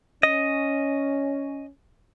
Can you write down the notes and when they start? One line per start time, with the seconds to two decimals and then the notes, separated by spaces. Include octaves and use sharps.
0.23 C#4 D#5